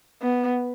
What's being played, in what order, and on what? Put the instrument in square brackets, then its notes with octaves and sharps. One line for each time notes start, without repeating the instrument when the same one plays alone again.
[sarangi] B3